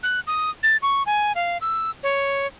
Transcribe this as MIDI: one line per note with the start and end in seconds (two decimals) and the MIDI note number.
0.03 0.20 90
0.27 0.50 87
0.63 0.77 93
0.82 1.03 85
1.06 1.32 80
1.35 1.58 77
1.61 1.90 88
2.03 2.47 73